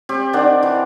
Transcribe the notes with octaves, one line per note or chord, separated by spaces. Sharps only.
C4 G4
D#3 D4 D5 F#5
E3